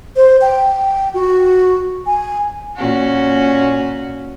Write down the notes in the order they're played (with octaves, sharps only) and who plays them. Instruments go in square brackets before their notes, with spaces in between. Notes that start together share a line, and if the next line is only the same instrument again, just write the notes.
[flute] C5
G5
F#4
G#5
[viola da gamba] A#2 C#4 F#4